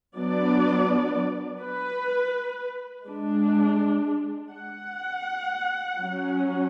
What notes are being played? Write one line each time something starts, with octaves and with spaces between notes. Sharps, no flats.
F#3 B3 D4 D5
B4
G#3 D4
F#5
F#3 C#4